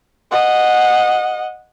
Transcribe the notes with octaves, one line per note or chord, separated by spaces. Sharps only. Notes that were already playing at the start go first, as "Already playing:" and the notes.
D#5 F#5